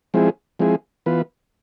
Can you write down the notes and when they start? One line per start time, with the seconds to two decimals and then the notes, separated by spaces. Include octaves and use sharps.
0.14 F3 G#3 C4 E4 G#4
0.59 F3 G#3 C4 E4 G#4
1.06 E3 B3 F4 B4